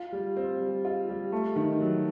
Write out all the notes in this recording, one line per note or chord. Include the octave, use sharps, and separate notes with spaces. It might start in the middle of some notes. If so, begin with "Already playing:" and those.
Already playing: F4
G3
C4
G3
F4
G3
A3
D#3
F#3